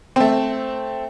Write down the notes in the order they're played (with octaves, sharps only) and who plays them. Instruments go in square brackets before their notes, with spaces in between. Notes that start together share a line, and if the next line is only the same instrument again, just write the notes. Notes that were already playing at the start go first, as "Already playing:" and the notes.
[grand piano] A3 C4